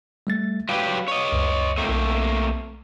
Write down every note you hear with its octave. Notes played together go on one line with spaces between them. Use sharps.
G3 A3 A6
F#3 G4 B4 F5
C#5 D#5
C#2 F#2
A3 A#3 C4
B1